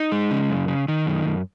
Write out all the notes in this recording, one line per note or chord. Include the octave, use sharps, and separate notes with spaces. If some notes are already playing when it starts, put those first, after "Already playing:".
Already playing: D#4
G#3
C#3
F#2
C#3
D#3
F#2
F#2